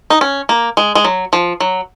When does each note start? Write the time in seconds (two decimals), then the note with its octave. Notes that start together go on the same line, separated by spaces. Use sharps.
0.10 D#4
0.21 C#4
0.49 A#3
0.77 G#3
0.95 G#3
1.05 F#3
1.33 F3
1.60 F#3